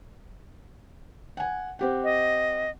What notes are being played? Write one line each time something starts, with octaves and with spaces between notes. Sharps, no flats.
F#5 G#5
C4 G4 F#5
D#5